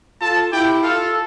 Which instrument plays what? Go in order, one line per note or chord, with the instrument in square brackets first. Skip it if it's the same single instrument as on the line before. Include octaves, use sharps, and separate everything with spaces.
[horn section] F4 A4 [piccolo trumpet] A5
[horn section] E4 G4 [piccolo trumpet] G5
[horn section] F4 A4 [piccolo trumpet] F5